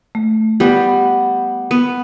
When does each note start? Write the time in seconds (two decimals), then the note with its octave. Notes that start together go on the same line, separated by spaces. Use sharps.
0.15 A3
0.60 G3 B3
1.71 B3